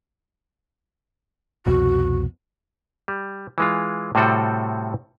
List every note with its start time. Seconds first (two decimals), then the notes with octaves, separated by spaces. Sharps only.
1.66 C2 F2 B2 F#4
3.08 G3
3.58 E3 G#3 F4
4.15 A2 C3 G3 C4 F#4 A4